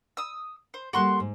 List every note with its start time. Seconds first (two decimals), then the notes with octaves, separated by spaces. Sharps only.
0.17 D#6 E6
0.74 C5
0.93 G3 A#3 F#4 A4 C6 F#6
1.20 G#2